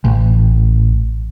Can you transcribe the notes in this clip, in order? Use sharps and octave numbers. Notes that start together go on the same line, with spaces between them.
A1